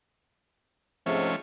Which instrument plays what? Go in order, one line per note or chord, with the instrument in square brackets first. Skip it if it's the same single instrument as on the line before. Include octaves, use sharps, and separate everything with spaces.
[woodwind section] G#2 C3 [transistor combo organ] F3 A3 C#4